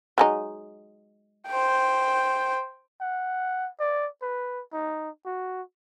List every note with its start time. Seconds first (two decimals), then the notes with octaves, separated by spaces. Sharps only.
0.18 F#3 G#3 D#4
1.48 C5 G5
3.01 F#5
3.80 D5
4.22 B4
4.73 D#4
5.26 F#4